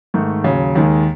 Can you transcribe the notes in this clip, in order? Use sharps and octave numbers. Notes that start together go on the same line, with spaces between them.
G#2 D#3 A3
D#2 C#3 F#3
D#2 D#3 G#3